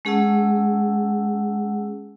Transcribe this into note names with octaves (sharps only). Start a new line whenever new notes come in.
G#3 C#4 G#4 F#5 A5 E6